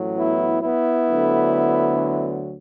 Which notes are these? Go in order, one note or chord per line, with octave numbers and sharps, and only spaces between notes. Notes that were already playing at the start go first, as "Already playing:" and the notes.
Already playing: A1 A2 F#3
B3 E4
B3 E4
D2 D3 F#3